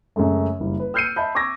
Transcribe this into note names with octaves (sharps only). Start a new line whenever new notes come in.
F#2 C#3 G#3 A3
F#1 G3
B4
E6 F6 G6 C7 C#7 D#7
D#5 E5 A5 B5 G6
C#6 D6 E6 G#6 A#6